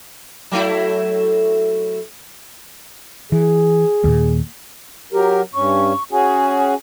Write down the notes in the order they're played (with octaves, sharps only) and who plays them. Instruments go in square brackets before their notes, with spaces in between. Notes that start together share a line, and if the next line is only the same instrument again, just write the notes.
[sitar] F#3 A3 E4
[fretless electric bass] E3 [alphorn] G#4
[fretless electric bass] D#2 A#2
[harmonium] F#3 A#4 [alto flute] G4
[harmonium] G2 C#4 [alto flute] C#6
[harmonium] C#4 F#4 G#4 [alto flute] G#5